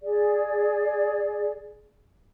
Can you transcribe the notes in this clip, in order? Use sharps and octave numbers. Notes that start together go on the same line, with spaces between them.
G#4 D5